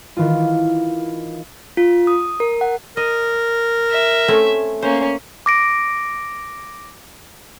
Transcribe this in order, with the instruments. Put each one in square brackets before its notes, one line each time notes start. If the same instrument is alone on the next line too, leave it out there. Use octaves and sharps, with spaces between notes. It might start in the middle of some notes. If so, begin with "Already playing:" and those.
[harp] D#3 E3 F4
[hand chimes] F4
D#6
A#4
F#5
[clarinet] A#4 [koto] D#5
[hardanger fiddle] E5
[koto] A3 C4 C#4
[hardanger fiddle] A#3 C#4 [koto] C5
[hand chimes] D6 A#6 D7